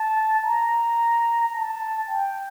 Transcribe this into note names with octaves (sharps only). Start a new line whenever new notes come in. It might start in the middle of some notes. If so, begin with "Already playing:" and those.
Already playing: A5
A#5
A5
G5